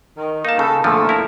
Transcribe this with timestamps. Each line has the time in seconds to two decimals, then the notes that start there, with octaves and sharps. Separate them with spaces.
0.17 D#3
0.45 A#3 D#4 A5
0.59 C#3 A4
0.84 A#2 D3 F3 A3
1.09 E4 A#4